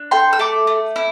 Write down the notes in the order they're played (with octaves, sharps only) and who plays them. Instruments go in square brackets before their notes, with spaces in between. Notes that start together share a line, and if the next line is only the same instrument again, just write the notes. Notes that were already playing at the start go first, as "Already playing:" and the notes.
Already playing: [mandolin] D4
A4 G5 C6
E6
A3 A5 D6
A3
E4